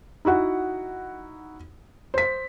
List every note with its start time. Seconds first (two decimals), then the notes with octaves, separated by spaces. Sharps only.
0.25 D#4 E4 F#4 F#5
2.14 C5 B6